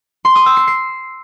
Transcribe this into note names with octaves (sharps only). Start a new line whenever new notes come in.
C6
D#6
E6
C7
C7